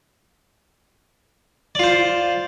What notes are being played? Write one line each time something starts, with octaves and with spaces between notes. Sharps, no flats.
F4 C5 D5